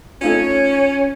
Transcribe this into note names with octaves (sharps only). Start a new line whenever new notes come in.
A3 C#4 D#4 F4 C#5